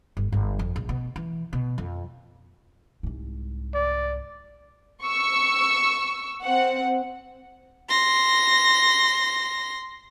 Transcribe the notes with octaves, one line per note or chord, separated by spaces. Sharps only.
G1
G1
F2
A#1
B2
E3
B2
F2
C2 G#2
D5
C#6 E6
C4 F#5
C6 A#6